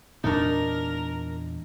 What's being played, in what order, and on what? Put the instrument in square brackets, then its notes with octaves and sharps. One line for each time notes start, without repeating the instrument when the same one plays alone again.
[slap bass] E2 A#2 G#3 [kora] D4 D#4 [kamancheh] A#4